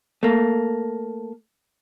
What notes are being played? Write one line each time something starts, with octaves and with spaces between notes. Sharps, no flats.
A3 A#3